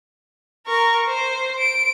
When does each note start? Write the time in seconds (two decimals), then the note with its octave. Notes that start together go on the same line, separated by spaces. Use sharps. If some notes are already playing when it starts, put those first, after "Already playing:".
0.67 A#4 C#6
1.08 C5
1.60 D7